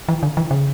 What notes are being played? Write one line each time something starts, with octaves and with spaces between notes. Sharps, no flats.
E3
D3
E3
C#3